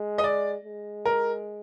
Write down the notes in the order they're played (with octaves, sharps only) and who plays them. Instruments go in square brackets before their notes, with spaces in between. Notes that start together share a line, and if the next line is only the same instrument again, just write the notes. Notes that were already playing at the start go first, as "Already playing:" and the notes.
Already playing: [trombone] G#3
[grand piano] D#5
D5
[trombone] G#3
[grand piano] A#4